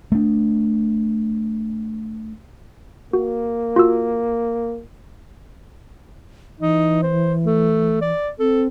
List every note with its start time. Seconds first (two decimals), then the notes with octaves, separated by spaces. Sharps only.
0.12 A3 D4
3.13 A#3 F#4
3.76 F4 F#4 E6
6.60 E3 D#4
7.03 C5
7.46 A3
8.01 D5
8.39 C4 A4